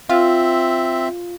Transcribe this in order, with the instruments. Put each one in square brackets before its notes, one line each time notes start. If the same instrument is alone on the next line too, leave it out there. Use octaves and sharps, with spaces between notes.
[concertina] C4 E5 [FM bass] F4